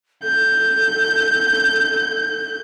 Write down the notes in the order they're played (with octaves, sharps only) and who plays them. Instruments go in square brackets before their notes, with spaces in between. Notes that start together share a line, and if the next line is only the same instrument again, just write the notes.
[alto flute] A4 [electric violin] G6